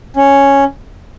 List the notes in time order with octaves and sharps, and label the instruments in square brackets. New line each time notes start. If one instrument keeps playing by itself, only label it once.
[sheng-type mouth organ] C#4